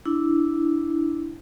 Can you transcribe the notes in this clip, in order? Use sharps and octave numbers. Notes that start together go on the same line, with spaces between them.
D4 E4